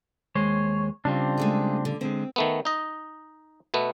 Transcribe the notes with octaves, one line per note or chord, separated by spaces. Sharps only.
D#2 G#3 C5 C#5
C#3 G3 C4 D4 F4
G#3 A3 G#4
D3
D3 G#3 C4
D#3 A3 B3
D#4 D#5
B2 A3 B3